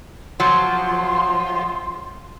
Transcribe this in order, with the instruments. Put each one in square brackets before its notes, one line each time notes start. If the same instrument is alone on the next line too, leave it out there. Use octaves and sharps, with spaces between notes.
[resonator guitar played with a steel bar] F3 F#3 [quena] C6